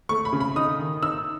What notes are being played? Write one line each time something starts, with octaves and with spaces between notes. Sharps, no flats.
A3 C#6
B5
C#3
B5
D#4 D#6
D#3
D#4 E6